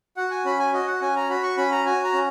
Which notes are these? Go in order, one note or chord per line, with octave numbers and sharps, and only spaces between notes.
F#4 F#5
G#5
C#4 B5
G#5
F#4 D#5
F#5
C#4 G#5
A#5
F#4 B5
C#6
C#4 B5
A#5
F#4 G#5
A#5
C#4